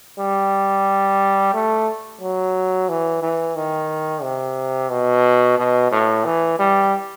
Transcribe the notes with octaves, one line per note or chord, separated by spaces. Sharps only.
G3
A3
F#3
E3
E3
D#3
C3
B2
B2
A2
E3
G3